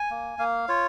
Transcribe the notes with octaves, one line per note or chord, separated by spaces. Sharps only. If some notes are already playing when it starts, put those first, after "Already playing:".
Already playing: G#5
A#3
A#3 F5
F4 C#5